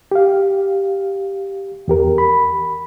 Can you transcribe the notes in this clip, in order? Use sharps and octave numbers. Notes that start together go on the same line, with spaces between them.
G4 F5
E2 G4 A#4
B5